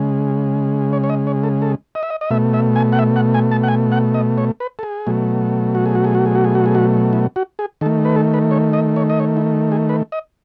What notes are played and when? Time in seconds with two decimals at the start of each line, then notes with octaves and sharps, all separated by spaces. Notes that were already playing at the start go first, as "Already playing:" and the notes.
Already playing: C#3 G#3
0.93 C#5
1.04 C#5
1.10 D#5
1.27 C#5
1.44 A4
1.62 A4
1.95 D#5
2.03 E5
2.10 D#5
2.21 D#5
2.30 B2 A3 E5
2.54 E5
2.76 G#5
2.92 F#5
2.99 E5
3.16 F#5
3.34 G#5
3.51 A5
3.63 F#5
3.68 G#5
3.92 F#5
4.14 D#5
4.38 C#5
4.60 B4
4.79 A4
4.83 G#4
5.07 B2 F#3 A3
5.75 F#4
5.86 G#4
5.95 F#4
6.04 G#4
6.15 F#4
6.26 G#4
6.35 F#4
6.44 G#4
6.55 F#4
6.66 G#4
6.75 F#4
7.13 E4
7.36 F#4
7.59 G#4
7.81 D#3 A4
7.86 A3
8.05 B4
8.16 A4
8.34 B4
8.51 C#5
8.73 D#5
8.96 C#5
9.10 D#5
9.20 C#5
9.37 E4
9.72 G#4
9.89 B4
10.12 D#5